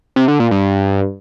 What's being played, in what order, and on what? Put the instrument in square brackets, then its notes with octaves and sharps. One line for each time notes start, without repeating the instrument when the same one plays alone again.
[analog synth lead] C3
D3
A#2
G2